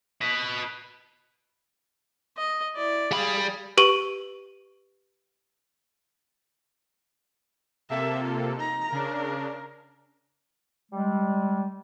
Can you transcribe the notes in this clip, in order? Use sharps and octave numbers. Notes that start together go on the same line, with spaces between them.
B4 D#5
D#5
E4 D5
G3 G#4 F5 B5
G4 B4 C#6 D#7 F#7
C3 A#3 A4 E5
F4
D#4 A#5
C#3 D4 A#4
G3 G#3